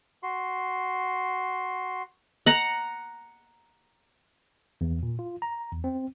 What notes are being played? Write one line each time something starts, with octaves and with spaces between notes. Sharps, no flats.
F#4 C6
F#5 A#5
E2
A#2
F4
A#5
E2
C4